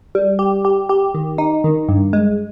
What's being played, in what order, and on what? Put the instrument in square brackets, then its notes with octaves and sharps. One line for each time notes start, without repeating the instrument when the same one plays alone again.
[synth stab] G3
G4
G4
G4
D#3
D#4
D#3
G2
G#3